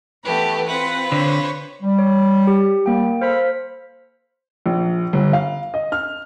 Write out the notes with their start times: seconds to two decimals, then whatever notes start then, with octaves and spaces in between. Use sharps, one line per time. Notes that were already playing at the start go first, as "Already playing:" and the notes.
0.24 E3 A3 B3 G4 B4
0.67 C4 F4 B4 F#5
1.12 D3 C5 C#5
1.82 G3
1.99 C#5
2.47 G4
2.86 G3 A#3 G5
3.22 A4 C5 F5 B5
4.66 A#1
5.13 G1
5.33 F5
5.74 D#5
5.92 F6